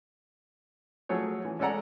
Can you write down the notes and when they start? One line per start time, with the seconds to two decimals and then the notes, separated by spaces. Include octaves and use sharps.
1.09 F3 F#3 A3 G#4 C#5
1.45 E3
1.59 G#3 C#4 A4 D5 F#5 A#5